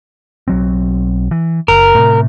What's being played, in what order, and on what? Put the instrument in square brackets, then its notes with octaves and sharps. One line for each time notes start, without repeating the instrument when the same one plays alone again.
[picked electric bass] B1 F#3 C4
E3
[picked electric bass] F#1 [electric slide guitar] A#4
[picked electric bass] A2 C3